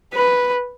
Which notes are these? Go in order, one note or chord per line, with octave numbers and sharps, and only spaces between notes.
B4